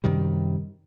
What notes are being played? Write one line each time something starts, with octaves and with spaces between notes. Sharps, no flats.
F#2 C3 D#3 G3